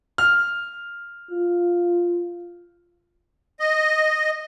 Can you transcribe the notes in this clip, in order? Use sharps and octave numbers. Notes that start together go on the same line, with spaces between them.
F6
F4
D#5